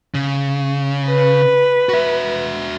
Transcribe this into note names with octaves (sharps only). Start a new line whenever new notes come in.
C#3
B4
F#4 E5